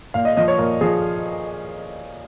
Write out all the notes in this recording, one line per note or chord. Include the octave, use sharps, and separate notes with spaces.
A#2 F5
D#5
F3 D#5
C#5
A#2 A#4
F3 G#4